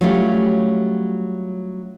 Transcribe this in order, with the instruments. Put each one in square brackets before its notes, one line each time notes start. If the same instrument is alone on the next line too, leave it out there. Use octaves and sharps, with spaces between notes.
[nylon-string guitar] F#3 G3 A3 C#4 F4 G4